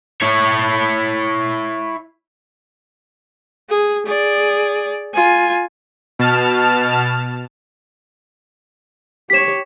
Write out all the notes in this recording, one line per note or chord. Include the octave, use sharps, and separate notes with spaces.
E4 C#5
G#4
G#4 D5
F4 G#5
B2 A5 F6
G4 C#5 B6 E7